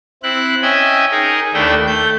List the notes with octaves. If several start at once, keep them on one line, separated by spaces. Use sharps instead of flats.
C4 E4 F#6
C#4 D#5 E5 G5 G#5
D#4 G#4 A#4
D#2 A3 D4 E4 E5 G5
A3 G6